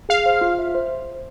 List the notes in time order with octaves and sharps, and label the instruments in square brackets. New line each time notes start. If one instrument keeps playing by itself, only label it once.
[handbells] G#4 [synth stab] F5
[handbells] C5
F4
E5
C5